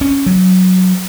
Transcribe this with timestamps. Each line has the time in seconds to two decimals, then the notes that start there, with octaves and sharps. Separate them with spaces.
0.01 C#4
0.26 F#3